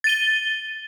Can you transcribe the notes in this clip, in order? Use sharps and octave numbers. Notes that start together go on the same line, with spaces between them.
A6 D#7 G7